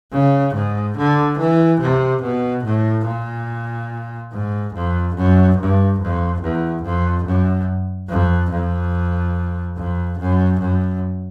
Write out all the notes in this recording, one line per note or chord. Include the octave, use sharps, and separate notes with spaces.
C#3
G#2
D3
E3
C3
B2
A2
A#2
G#2
F2
F#2
G2
F2
E2
F2
F#2
F2
F2
F2
F#2
F#2